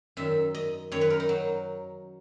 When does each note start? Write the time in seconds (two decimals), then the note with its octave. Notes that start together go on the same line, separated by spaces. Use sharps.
0.17 F#2 D#3 E5
0.55 D#5
0.92 F#2 D#3 C#5
1.01 B4
1.10 A#4
1.20 D#4
1.29 F#3